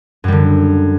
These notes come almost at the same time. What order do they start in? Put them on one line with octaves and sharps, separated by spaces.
F#2 G3 D3